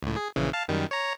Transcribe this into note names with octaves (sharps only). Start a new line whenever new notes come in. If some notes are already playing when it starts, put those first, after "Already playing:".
C#2 A2
G#4
A#1 C#3 E3
F5 A5
F#2 D#3 G3
C#5 A#5